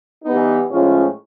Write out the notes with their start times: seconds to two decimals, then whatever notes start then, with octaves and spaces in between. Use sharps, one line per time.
0.24 E3 G3 B3 D#4
0.68 A2 F3 G#3 C#4 F4